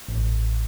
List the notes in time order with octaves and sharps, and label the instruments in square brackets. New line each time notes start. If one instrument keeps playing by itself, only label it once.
[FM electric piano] A1